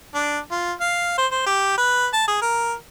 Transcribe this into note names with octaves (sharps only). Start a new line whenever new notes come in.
D4
F4
F5
C5
C5
G4
B4
A5
G#4
A#4